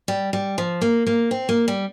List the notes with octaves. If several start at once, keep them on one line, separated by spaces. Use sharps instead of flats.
G3
G3
F3
A#3
A#3
C4
A#3
G3